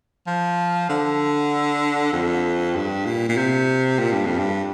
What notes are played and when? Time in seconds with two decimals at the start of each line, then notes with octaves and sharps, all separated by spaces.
0.27 F3
0.89 D3
2.13 F2
2.75 G2
3.05 A#2
3.29 A#2
3.37 C3
3.99 A#2
4.12 G2
4.25 F2
4.38 G2